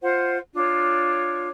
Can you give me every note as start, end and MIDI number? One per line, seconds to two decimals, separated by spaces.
0.02 0.36 65
0.02 0.36 72
0.02 0.36 78
0.53 1.48 62
0.53 1.48 65
0.53 1.48 73